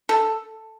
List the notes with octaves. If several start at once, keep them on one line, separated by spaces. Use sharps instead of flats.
A4